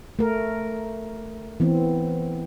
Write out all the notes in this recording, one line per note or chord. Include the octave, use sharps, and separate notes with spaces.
A3 A#4
E3 B3 C4